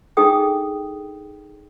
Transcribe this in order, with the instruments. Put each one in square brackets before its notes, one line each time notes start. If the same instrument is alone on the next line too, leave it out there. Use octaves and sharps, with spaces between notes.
[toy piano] D4 D#4 G#4 A4 G5 D#6